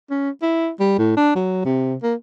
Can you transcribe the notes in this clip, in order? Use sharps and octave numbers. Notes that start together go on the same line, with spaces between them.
C#4
E4
G3
A2
D4
F#3
C3
A#3